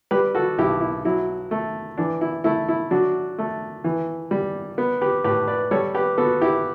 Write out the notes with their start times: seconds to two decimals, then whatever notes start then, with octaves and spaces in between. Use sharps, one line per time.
0.11 G3 G4 B4
0.35 F#4 A4
0.58 B1 E4 G4
0.81 E4
1.05 F#3 E4
1.51 A3
1.98 E3 D4
2.21 E4
2.44 A3 E4
2.68 E4
2.91 F#3 D4 F#4
3.38 A3
3.84 E3
4.31 G3
4.78 B3
5.01 G4 B4
5.24 A2 G4 B4
5.47 B4 D5
5.71 G3 A4 C#5
5.95 G4 B4
6.18 B3 F#4 A4
6.41 E4 G4